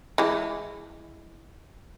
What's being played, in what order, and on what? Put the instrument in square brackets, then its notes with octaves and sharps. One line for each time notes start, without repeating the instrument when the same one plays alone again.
[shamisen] E3 G#3